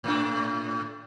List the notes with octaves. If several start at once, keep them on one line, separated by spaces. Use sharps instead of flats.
A2 A3 D4